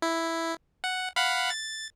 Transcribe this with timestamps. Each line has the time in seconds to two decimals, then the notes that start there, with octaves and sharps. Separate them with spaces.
0.02 E4
0.84 F#5
1.16 F5 F#5 B5
1.50 A6